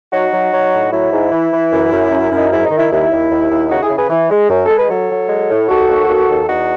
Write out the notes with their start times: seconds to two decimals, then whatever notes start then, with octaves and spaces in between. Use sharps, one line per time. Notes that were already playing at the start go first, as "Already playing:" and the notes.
0.12 F#3 D#4 F#4
0.32 F#3
0.52 F#3
0.73 A2
0.91 F#3 E4
1.12 G#2
1.31 E3
1.51 E3
1.72 F#2
1.92 F#2
2.11 F#2
2.31 F#2
2.38 D#4
2.51 G#2 E4
2.64 D#4
2.71 D#3
2.78 E4
2.90 D#2 E4
3.11 D#2
3.30 D#2
3.50 D#2
3.70 C#3 D#4 F#4
3.83 E4 G#4
3.89 C#3
3.97 G#4 B4
4.09 E3
4.30 G#3
4.49 F#2
4.66 G#3 A4
4.77 B4
4.89 F#3 A4 C#5
5.10 F#3
5.29 G#3
5.49 A2
5.68 D#2 F#4 A4
5.89 D#2
6.09 D#2
6.28 D#2
6.48 E2 D#4 F#4